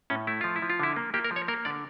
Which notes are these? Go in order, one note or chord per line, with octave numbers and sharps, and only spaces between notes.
A2 C#4
A3 E4
F3 F4
E4
F3
F4
D3 E4
A#3
A#3 G4
A#4
F3
C#5
A#3 A#4
D3 D5